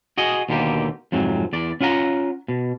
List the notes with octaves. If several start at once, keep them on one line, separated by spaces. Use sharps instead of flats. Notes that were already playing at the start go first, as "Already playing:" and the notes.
F#4 G#4 D#5
D#2 B2 D3 A#3 G4
F2 G#2 C3 F#3
E2 D5
C#4 F4 F5 F#5 A#5
B2